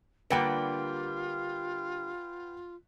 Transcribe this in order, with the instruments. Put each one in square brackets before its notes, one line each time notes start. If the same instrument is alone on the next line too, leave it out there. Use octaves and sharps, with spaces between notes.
[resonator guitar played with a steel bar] D3 G3 A#3 [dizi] F4 [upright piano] B4 F#5 G5